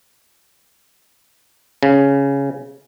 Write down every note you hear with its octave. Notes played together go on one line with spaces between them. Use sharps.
C#3